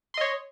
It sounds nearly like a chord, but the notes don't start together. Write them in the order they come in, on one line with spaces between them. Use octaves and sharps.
C6 D#5 C#5